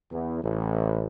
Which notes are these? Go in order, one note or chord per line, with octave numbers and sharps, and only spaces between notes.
E2
A1